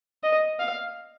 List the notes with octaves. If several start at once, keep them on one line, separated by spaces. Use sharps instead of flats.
D#5
F5